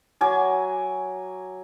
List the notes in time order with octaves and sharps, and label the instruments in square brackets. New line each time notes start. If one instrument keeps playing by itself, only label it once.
[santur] F#3 G#5 D6